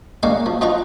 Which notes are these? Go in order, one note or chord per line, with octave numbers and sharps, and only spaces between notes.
G#3 A#3 C#5 D5 F5 F#5
F3
F3 D#4 F4 F#5 A#5 C#6